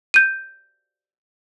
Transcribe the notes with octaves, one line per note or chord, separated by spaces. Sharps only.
G6 D#7